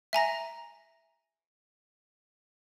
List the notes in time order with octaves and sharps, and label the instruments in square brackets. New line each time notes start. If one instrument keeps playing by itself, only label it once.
[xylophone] E5 G#5 A#5 A#6